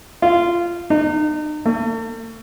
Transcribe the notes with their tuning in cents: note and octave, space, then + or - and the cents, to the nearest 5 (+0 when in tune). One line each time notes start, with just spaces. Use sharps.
F4 -15
D#4 -40
A3 +40